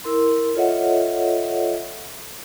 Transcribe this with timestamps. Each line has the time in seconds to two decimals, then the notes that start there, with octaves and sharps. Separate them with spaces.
0.04 E4 A#4 C6
0.55 F4 A4 C#5 D#5 E5 F#5